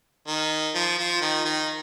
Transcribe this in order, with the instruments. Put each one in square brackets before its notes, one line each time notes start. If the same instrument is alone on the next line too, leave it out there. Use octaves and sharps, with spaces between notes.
[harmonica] D#3
F3
F3
D#3
D#3